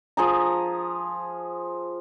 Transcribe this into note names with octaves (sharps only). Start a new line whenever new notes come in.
F3 G#4 A#5